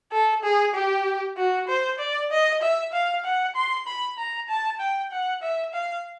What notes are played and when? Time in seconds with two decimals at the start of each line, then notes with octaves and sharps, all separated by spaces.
0.12 A4
0.43 G#4
0.74 G4
1.37 F#4
1.68 C5
1.99 D5
2.31 D#5
2.62 E5
2.93 F5
3.24 F#5
3.55 C6
3.87 B5
4.18 A#5
4.49 A5
4.80 G5
5.12 F#5
5.42 E5
5.74 F5